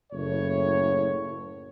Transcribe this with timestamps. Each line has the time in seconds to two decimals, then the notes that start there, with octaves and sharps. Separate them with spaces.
0.13 F#1 A2 C#5